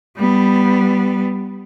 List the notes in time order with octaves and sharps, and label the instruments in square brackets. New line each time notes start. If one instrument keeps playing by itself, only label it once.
[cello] G3 B3